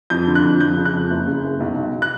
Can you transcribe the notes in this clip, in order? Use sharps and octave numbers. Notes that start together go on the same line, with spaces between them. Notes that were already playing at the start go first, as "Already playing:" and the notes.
F2 G6
D3
F#6
F2
F2 G6
C#3
F#6
F2
F#1
C#3
F#1
B1
B1
F#6